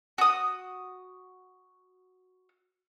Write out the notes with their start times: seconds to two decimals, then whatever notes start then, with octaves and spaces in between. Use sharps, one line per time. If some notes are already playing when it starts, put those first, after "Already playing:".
0.18 F#4 D#6